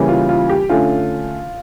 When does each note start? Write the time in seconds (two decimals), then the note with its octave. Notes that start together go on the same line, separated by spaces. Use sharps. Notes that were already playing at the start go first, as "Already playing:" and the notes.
Already playing: C#3 E3 G3 A#3 C#4
0.09 F4
0.29 F4
0.49 G4
0.69 D3 A3 C#4 F4